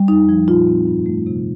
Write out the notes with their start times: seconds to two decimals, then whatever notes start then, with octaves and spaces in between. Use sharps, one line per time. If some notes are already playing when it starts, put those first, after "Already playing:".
Already playing: G3
0.08 F2 D#4
0.29 F3
0.48 A#2 F4
0.68 C4
0.87 G2
1.06 A3
1.27 C3